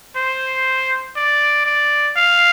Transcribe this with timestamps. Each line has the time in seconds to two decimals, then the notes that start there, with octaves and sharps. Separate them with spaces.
0.16 C5
1.16 D5
1.66 D5
2.16 F5